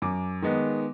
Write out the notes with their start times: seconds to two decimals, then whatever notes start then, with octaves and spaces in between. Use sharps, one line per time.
0.02 F#2 D6
0.42 D#3 G#3 B3 D#4